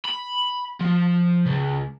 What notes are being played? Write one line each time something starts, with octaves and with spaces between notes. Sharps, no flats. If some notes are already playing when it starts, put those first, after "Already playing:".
B5
F3
C#2